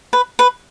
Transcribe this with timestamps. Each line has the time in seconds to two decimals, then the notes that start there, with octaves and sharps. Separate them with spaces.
0.13 B4
0.39 B4